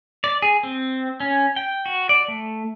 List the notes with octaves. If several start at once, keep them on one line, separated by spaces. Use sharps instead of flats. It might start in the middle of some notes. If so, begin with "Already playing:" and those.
D5
G#4
C4
C#4
G5
F#4
D5
A3